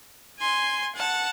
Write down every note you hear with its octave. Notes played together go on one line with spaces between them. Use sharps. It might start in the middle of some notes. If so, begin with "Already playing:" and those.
G#5 C6
F#5 A5